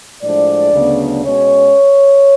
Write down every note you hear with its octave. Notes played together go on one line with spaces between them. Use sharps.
A2 F3 G#3 D4 D5
D2 C#3 F#3 B3 D4
B2 G#3 C#4 C#5